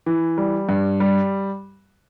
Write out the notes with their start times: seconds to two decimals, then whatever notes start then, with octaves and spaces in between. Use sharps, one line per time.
0.06 E3
0.38 G3
0.69 G2
1.00 G3